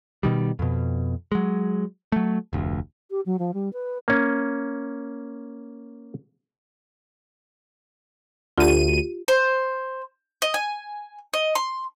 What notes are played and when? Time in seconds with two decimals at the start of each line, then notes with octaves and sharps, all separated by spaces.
0.23 B2 D#3 G3
0.59 F2 B2
1.32 F#3 G#3
2.12 F#3 A3
2.53 F1 D2
3.11 G4
3.26 F#3
3.39 F3
3.54 G3
3.73 B4
4.08 A#3 C#4
8.58 D2 F4 G4 D#7
9.28 C5
10.42 D#5
10.54 G#5
11.33 D#5
11.55 C6